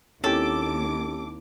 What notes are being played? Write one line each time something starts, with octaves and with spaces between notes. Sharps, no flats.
D#2 C4 C#4 E4 G4 A4 A#4 D6